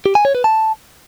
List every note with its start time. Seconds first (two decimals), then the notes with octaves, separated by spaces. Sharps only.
0.06 G4
0.15 G#5
0.25 C#5
0.35 B4
0.44 A5